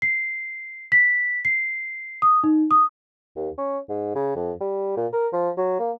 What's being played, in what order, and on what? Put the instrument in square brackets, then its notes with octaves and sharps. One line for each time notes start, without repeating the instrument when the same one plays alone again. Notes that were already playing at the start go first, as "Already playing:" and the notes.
[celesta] C7
B6
C7
D#6
D#4
D#6
[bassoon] D#2
C#4
G#2
C#3
F2
G3
A#2
A#4
F3
F#3
A#3